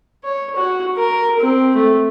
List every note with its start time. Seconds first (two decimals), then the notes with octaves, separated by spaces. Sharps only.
0.24 C#5
0.57 F#4
0.97 A#4
1.40 C4
1.76 A3